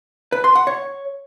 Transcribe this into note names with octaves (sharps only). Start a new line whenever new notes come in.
B4
C6
F#5
C#5